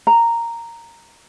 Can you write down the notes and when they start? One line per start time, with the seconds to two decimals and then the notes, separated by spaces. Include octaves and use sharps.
0.07 A#5